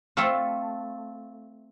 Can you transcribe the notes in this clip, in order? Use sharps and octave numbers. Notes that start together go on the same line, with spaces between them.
A3 C4 F4 A4